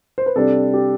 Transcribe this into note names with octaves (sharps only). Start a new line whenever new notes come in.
C5
B4
C3 G3 D4 A4
G4